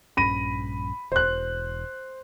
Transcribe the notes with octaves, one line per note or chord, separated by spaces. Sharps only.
A#1 G2 C#4 B5 A#6 D#7
E1 C5 F#6